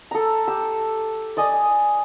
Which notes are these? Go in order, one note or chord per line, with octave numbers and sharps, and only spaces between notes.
A4 A#5
G4 E6
D5 D#5 G#5 D#6